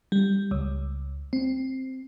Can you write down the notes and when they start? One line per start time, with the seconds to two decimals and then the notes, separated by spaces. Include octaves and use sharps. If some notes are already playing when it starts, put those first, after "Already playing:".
0.12 G3
0.51 C#2
1.33 C4